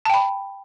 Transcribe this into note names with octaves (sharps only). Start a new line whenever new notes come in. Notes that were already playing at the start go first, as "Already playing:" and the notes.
G5 A5 B5